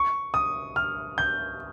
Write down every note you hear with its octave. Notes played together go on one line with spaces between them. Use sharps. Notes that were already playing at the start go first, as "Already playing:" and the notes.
Already playing: C#6
D#6
F6
G6